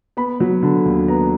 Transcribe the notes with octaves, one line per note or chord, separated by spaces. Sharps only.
B3 B5
F#3
D3
D#2
B3 A#5